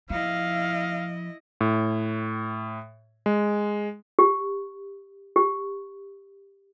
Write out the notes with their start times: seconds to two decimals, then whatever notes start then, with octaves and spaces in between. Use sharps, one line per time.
0.10 F3 E4 D#5 F5
1.61 A2
3.26 G#3
4.19 G4
5.36 G4